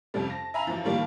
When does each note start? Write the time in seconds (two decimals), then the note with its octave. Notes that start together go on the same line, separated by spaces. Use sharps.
0.14 F2 C3 F3 G3
0.27 A5 A#6
0.54 E5 F5 G#5 A#5 B5
0.67 F#2 E3 F3
0.84 A2 D#3 F3 G3 A#3